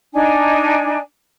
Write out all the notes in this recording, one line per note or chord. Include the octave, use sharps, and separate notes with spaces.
D4 D#4 G#5